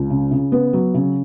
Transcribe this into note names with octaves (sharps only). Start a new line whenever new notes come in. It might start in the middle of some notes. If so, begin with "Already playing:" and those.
Already playing: C#2
C#3
C#3
B3
F#3
C#3